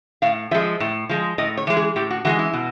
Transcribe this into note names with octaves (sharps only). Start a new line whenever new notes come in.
A2 F5
F3 G#3 E5
A2
F3 G#3
A2 D#5
C#5
E3 G#3
G#4
A2 G4
F#4
E3 G#3 F#4
E4
B2